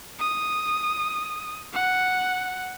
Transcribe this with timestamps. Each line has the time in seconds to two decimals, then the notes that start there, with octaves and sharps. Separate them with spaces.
0.19 D#6
1.73 F#5